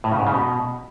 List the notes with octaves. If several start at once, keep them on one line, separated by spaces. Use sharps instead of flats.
A2
C#3
G#2
C#3
B2